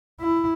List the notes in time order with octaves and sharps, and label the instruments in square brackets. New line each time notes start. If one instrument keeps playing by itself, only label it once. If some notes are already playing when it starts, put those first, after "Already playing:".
[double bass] E4